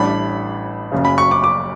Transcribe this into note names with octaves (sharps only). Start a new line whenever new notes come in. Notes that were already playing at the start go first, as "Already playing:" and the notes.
Already playing: A1 A2 G3 D4 B5
F#1 F#2 C#3
B5
C#6
D6
D6